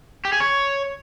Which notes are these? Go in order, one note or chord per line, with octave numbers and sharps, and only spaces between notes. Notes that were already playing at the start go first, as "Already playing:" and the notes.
G4
G#4
C#5